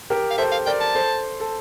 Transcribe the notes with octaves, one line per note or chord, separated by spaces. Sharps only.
G4 A#4
F5
A4 C5 E5
F5
A#4 D5 G5
A5
A4 C5
A4